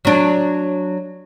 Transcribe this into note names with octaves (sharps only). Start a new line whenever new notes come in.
F#3 D4